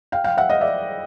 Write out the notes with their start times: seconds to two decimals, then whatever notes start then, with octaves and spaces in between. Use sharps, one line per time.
0.12 F5 G5
0.24 F5 G5
0.37 E5 F#5
0.50 D#5 F5
0.61 D5 E5